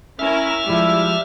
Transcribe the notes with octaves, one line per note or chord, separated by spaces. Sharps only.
C#4 E4 A#4 E5 F6
F3 G3 G#3 E4